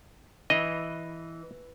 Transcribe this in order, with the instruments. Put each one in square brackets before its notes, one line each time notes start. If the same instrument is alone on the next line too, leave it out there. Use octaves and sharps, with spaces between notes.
[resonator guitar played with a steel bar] E3 [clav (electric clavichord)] D#5